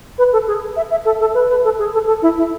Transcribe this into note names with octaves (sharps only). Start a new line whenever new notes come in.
B4
A4
G#4
E5
E5
A4
A4
B4
B4
A4
G#4
A4
A4
E4
E4